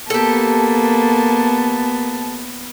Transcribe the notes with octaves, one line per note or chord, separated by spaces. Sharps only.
A#3 B3 G4 A4 A5